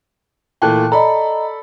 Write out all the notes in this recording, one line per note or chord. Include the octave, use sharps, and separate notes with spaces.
A#2 E3 A3 G5 A5 F#6
A4 D5 D#5 A#5 B5